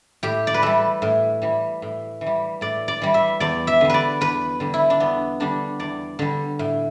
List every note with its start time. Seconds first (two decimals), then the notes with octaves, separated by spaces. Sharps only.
0.23 A2 G4
0.47 D5
0.54 B4
0.62 E3 G3 A4
1.02 A2
1.42 E3 G3
1.82 A2
2.21 E3
2.26 G3
2.61 A2 D5
2.88 D5
3.02 E3 G3
3.14 E5
3.40 E2 D5
3.67 E5
3.81 D3 G3
3.90 B4 D5
4.21 E2 B4
4.60 D3 G3
4.74 E4
4.90 D4
5.00 E2 B3
5.40 D3 G3 D4
5.80 E2 D5
6.19 D3 G3
6.59 A2